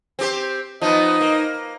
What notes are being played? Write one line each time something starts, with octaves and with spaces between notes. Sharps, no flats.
C4 G4 C5
F3 B3 D#4 D#5
A#3